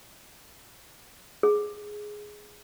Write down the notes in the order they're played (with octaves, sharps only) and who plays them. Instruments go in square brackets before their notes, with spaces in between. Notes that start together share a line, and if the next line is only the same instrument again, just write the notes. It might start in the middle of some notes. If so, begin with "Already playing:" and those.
[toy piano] G#4